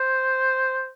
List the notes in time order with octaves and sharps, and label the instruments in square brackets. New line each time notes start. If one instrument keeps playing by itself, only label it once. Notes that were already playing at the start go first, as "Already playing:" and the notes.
Already playing: [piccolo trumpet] C5